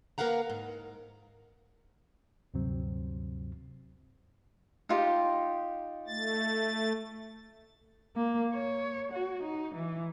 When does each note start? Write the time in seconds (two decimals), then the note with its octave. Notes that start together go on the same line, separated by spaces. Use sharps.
0.18 A#3 A#4 B4 F5 F#5 A#5
0.50 G#2
2.54 D2 G2 C3 F#3 C4
4.89 D#4 F4 G4
6.07 A3 A6
8.17 A#3
8.53 C#5
9.12 F#4
9.43 D#4
9.74 E3